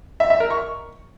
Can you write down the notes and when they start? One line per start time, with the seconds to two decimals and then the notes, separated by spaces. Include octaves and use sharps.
0.20 E5
0.30 E5
0.40 A#4
0.50 C#6